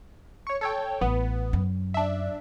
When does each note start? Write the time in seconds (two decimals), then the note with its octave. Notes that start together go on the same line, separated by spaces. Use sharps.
0.47 C#5 C#6
0.61 A4 C#5 G5
1.01 A1 B3
1.53 F#2
1.94 D4 E5